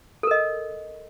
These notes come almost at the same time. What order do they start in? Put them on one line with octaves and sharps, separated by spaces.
A4 A#4 D#5